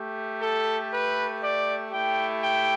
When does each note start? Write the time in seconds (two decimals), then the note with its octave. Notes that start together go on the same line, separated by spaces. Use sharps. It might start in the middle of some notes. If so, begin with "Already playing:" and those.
Already playing: A3 G4
0.40 A4
0.90 B4
1.40 D5
1.91 A3 E4 G4 G5
2.41 G5